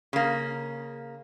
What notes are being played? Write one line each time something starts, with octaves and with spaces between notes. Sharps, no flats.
C#3 A#3